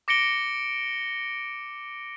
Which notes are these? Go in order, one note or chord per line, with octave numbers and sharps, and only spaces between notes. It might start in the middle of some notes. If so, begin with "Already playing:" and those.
D6 A#6 C#7 D7 G7